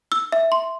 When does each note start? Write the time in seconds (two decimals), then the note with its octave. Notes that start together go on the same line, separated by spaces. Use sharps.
0.12 E6
0.32 E5
0.52 C6